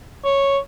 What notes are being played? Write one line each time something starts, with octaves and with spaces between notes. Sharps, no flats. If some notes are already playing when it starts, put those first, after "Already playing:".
C#5